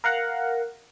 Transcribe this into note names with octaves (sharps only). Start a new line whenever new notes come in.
A#4 F5 F#5 A#5